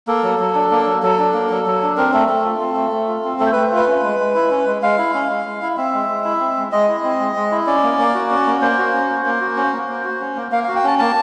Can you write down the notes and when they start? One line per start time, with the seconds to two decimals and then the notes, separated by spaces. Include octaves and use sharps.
0.07 A#3 A4
0.23 F#3
0.39 F#3
0.55 D4
0.71 A#3
0.87 F#3
1.03 F#3 A4
1.19 D4
1.34 A#3
1.50 F#3
1.66 F#3
1.82 D4
1.97 C4 A#4
2.14 A3 A4
2.29 A3 A4
2.45 F4
2.61 C4
2.76 A3
2.92 A3
3.08 F4
3.24 C4
3.40 A3 A4
3.46 C5
3.52 A3 B4
3.72 F4 B4
3.87 C#4
4.03 G#3
4.19 G#3
4.35 E4
4.51 C#4
4.67 G#3
4.82 G#3 F5
4.98 E4
5.14 C#4
5.30 G#3
5.46 G#3
5.62 E4
5.77 C4 E5
5.93 G#3
6.09 G#3
6.25 E4
6.40 C4
6.57 G#3
6.72 G#3 D#5
6.88 E4
7.04 C4
7.20 G#3
7.36 G#3
7.51 E4
7.67 C#4 D5
7.83 A#3
7.99 A#3
8.14 F#4
8.30 C#4
8.47 A#3
8.61 A#3 C5
8.78 F#4
8.93 C#4
9.10 A#3
9.25 A#3
9.41 F#4
9.56 C#4 C5
9.73 A#3
9.89 A#3
10.04 F#4
10.20 C#4
10.36 A#3
10.52 A#3 F5
10.64 F#4 F5
10.76 G5
10.84 C#4 A5
10.99 A#3 A5